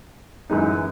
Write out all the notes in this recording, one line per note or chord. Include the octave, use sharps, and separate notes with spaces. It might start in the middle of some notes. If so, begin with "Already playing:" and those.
F#2 E3 G#3 D#4